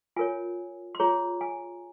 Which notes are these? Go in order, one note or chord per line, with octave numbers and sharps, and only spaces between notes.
F4 A#4 C#5 G#5
C6
F4 G#4 C#5 A#5
G#5